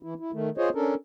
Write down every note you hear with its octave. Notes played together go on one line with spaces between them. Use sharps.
E3 E4
E4
D#3 A3
F4 G#4 C5 C#5 D#5
C#4 D4 A4 A#4